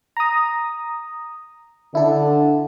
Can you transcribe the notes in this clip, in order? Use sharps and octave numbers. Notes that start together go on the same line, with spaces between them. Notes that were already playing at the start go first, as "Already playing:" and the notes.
A#5 D#6
D3 D4 E4 A4